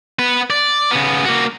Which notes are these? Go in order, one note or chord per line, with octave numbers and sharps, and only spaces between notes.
B3 B4
D5
C#3 B3
A#3 F#4